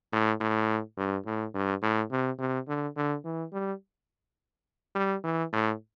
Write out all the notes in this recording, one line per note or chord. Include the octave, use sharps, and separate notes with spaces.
A2
A2
G2
A2
G2
A2
C3
C3
D3
D3
E3
G3
G3
E3
A2